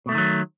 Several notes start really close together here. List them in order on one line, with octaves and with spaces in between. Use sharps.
B2 A3 D3 D#3 F#3